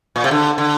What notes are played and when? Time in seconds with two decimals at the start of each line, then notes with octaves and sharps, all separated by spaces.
0.16 A#2
0.24 C3
0.31 D3
0.58 D3